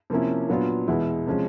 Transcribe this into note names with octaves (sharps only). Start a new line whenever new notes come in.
C3 F3 A#3 C#4 E4
A#2 F#3 B3 D4 F4
E2 B2 G#3 B3 E4
C3 F3 G#3 C#4